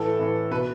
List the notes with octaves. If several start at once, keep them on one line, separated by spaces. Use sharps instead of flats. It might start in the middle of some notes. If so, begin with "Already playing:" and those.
Already playing: A2 E3 A4
A2 E3
B2 B4